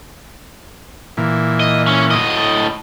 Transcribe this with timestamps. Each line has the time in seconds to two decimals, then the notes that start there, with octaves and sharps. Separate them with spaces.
1.17 A#2 E3
1.60 D#5
1.87 C#4
2.11 A2 D#5
2.36 A4